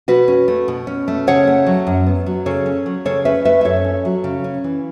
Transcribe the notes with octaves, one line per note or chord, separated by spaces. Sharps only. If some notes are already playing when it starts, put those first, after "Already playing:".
B2 F#4 B4
C#4
A3
B2
C#4
A3
C#3 C#5 F#5
A3
F#3
F#2
B3
F#3
C#3 A4 C#5
C#4
F#3
C#3 A4 C#5
C#4 B4 E5
A3 B4 E5
E5
F#2 A4 C#5
C#4
F#3
C#3
C#4
E3